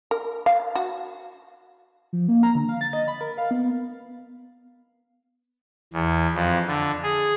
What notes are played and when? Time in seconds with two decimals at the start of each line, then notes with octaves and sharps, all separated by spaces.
0.11 A#4
0.46 F5
0.75 F#4
2.13 F3
2.28 A#3
2.43 A#5
2.55 D3
2.69 F5
2.81 A6
2.93 D#5
3.08 B5
3.21 A#4
3.38 F5
3.51 B3
5.93 E2
6.35 F2
6.68 D3
7.03 G#4